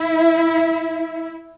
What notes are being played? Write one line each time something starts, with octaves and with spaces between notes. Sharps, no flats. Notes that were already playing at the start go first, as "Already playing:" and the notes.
Already playing: E4